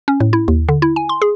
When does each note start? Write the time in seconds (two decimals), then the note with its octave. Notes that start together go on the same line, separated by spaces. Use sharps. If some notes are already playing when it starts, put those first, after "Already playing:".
0.08 C#4
0.20 A2
0.33 E4
0.48 D#2
0.69 D3
0.82 E4
0.96 G#5
1.09 C6
1.22 G#4